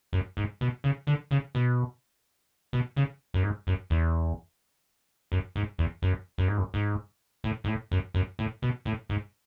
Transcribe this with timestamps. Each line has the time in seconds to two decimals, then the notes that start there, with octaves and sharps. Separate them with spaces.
0.13 F#2
0.37 G#2
0.61 B2
0.84 C#3
1.07 D3
1.31 C#3
1.55 B2
2.73 B2
2.96 C#3
3.34 F#2
3.43 G#2
3.67 F#2
3.90 E2
5.32 F#2
5.56 G#2
5.78 E2
6.02 F#2
6.38 F#2
6.48 G#2
6.58 F#2
6.74 G#2
7.44 A2
7.64 G#2
7.68 A2
7.91 F#2
8.14 F#2
8.39 A2
8.62 B2
8.85 A2
9.09 G#2